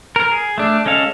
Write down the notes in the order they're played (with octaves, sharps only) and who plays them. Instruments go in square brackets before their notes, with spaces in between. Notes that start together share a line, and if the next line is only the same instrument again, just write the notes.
[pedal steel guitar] A#4
G#4
A3 D4
G#3 C#4 A4 F5